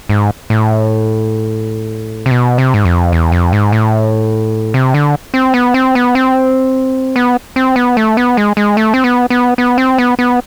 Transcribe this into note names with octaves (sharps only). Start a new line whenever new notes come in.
G#2
A2
C3
B2
C3
G#2
F2
E2
F2
G#2
A2
C3
D3
C4
B3
C4
B3
C4
B3
C4
B3
A3
B3
G#3
G#3
A3
C4
B3
B3
B3
C4
B3
B3